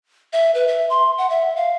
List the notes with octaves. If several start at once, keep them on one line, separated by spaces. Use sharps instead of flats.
E5
B4
E5
C6
F#5
E5
F5